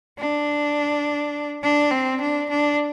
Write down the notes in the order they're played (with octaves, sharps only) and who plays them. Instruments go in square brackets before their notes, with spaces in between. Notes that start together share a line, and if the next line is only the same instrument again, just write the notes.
[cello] D4
D4
C4
D4
D4